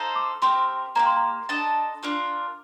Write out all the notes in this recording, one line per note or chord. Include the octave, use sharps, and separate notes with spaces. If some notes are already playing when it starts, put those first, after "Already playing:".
Already playing: D#4 A4 C5 F5 A#5
D6
C4 G4 A#4 C6
C6
A#3 D4 G4 A#5
C6
A#5
D4 A4 D#5 A5
D4 F4 A#4